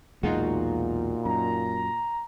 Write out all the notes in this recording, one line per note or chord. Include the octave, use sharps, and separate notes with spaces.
B1 E2 A#2 G#3 D#4 F4 F#4
F#2 A#5